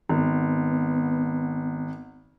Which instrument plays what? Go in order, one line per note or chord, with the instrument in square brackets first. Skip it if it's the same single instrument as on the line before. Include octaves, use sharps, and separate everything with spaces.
[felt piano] G#1 [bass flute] B3